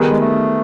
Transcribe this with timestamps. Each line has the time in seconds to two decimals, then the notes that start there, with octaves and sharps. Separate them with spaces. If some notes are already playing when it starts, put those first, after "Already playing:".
Already playing: D#3 G3 B3 D#4 G#4
0.11 G#3
0.20 A3